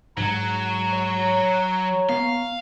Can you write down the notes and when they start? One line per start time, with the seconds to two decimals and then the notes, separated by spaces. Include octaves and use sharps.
0.18 G#2 F#3 A#5
0.93 C#5
2.09 B3 F5